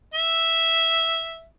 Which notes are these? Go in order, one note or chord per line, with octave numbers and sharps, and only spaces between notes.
E5